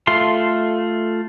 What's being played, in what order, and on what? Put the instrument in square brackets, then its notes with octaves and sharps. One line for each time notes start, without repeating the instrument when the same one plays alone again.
[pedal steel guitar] A3 F4 A4 C6